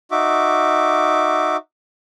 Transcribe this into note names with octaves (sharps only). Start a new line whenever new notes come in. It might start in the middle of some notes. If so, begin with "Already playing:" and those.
D#4 F#4 E5 D6